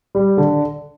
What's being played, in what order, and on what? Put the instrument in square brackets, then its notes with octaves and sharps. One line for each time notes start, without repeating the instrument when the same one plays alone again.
[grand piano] G3
D3